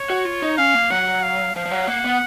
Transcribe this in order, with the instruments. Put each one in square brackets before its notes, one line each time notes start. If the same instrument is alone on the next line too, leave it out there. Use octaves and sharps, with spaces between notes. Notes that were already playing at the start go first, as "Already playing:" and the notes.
Already playing: [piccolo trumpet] C#5
[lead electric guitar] F#4
F4
D#4
[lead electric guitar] C#4 [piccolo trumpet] F5
[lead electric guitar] A#3
[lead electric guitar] F#3 [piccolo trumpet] F#5
[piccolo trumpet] F5
[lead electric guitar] F3 [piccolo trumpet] F5
[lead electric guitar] F3
F#3
[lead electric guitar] A#3 [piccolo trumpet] F#5
[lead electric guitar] B3